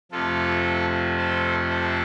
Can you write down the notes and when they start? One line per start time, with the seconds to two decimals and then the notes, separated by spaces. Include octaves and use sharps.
0.12 F2 C3 F3 A3 F4 A4
1.17 A4 C5
1.70 A4 C5